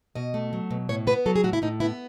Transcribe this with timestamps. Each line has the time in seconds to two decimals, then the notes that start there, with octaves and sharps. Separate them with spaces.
0.15 B2 D#5
0.34 A3
0.53 F#3
0.71 B2
0.89 A2 C#5
1.07 B3 B4
1.26 F#3 A4
1.36 G#4
1.44 A2 F#4
1.53 E4
1.62 A2 D#4
1.80 B3 E4